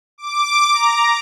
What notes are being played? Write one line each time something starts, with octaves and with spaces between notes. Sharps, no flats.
D6
A#5